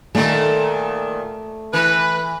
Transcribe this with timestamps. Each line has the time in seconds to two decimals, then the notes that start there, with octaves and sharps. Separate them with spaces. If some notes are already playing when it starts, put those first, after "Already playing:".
0.15 A#2 D#3 A3
1.73 E3 B4